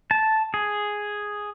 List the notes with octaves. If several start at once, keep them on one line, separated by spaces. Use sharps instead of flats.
A5
G#4